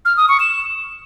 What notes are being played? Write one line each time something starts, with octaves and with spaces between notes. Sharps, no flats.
F6
D#6
C#6
E7